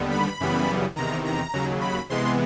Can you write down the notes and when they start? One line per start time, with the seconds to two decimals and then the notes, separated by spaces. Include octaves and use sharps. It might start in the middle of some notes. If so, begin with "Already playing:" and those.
Already playing: D#2 D3 G3 B3
0.11 B5
0.40 F#2 C#3 E3 G3 B3
0.96 E2 C3 D#3 A#5
1.25 A#5
1.53 D#2 C#3 F#3
1.81 B5
2.10 C3 E3 G#3 B3 C6